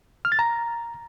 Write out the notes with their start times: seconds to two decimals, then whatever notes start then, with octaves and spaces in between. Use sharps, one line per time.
0.25 F6
0.32 A6
0.39 A#5